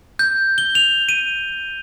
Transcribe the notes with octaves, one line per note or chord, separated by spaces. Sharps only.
G6
G7
F7
D#7